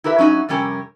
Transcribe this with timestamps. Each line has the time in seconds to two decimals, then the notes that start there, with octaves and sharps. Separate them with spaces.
0.04 E4 G4 A#4 B4 E5
0.18 F#3 C#4 D#4 F#4
0.49 F2 C3 G3 C#4 G4 A#4